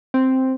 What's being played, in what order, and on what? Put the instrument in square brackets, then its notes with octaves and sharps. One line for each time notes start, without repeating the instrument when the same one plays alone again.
[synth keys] C4